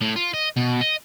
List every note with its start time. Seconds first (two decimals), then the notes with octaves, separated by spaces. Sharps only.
0.01 A2
0.16 F4
0.34 D#5
0.57 B2
0.81 D#5